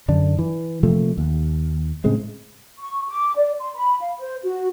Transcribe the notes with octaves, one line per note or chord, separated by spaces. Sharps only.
F#2 D3 D4
E3
C3 F3 A3 A#3
D#2
A2 C#3 G#3 C4
C#6
D6
D5
C6
B5
F5
C5
F#4